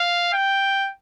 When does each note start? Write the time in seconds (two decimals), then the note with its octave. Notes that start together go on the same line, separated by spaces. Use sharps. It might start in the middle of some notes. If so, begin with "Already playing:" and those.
Already playing: F5
0.33 G5